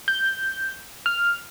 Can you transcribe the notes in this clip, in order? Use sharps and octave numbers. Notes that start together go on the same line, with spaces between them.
G6
F6